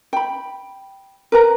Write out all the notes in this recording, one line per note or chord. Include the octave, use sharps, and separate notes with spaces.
G5 B5
A#4 B4 A#5